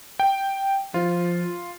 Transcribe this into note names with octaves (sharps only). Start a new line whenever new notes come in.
G5
F3 F4